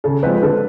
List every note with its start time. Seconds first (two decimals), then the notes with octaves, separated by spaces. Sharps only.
0.04 C#3 A4
0.23 F3 G#3 C4 F4 B4
0.42 D3 A4